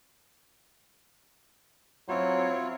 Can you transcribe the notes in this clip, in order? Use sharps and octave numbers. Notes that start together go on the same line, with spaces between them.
F#3 C4 E4 F4 C#5